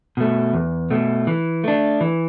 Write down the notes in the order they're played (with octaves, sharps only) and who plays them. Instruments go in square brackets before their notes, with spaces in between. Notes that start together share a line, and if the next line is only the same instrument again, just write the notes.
[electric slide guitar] B2 A3
E2
B2 A3
E3
A3 D4
E3